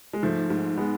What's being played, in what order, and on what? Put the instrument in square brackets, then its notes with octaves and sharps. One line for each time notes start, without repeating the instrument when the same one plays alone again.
[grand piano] G#3
[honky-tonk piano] G#2 [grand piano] F3 A3
[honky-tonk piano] G#2
[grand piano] G#3 B3